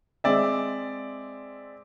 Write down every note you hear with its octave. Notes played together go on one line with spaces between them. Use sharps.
G#3 C4 D5 E5